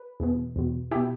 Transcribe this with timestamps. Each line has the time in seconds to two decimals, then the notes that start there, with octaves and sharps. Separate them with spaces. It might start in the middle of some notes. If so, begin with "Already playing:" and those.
Already playing: B4
0.20 E2 B2
0.56 E2 B2
0.91 B2 E4 G4